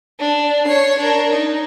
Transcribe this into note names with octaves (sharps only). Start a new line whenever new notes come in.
D4
C#5 C7
D4 A#4
D#4